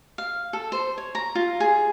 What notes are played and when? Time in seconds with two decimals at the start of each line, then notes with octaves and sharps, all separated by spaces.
0.18 F5
0.53 A4
0.72 C5
0.98 C#5
1.15 A#5
1.35 F4
1.60 G#4